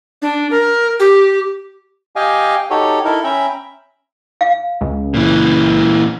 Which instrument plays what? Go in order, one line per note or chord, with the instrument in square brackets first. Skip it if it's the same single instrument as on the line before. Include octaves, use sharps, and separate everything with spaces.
[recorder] D4
A#4
G4
[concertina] G4 D#5 F5 G5 G#5
D#4 F#4 G4 A4 C#5
D#4 E4 A4 A#4
C#4 E5 G5 A#5 B5
[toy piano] F5
[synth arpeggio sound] C#2
[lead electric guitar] A#2 E3